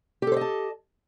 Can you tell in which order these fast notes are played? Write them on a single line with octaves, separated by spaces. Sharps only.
G4 A4 C5 D#5 A5